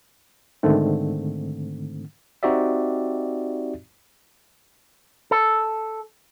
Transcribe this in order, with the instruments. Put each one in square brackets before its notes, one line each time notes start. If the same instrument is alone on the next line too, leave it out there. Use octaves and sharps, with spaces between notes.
[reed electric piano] G#2 D3 D#3 A3 C4
[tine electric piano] C4 D#4 F#4 G4 D5 E5
[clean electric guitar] A4